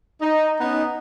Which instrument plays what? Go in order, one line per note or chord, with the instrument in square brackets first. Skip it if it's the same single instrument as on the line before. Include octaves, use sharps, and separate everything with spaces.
[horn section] D#4
B3 C#4 D#4